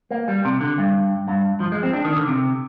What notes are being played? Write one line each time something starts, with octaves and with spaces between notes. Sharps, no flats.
A#3
G3
C3
D3
G2
G2
F3
G#3
C4
D4
D#3
D3
C3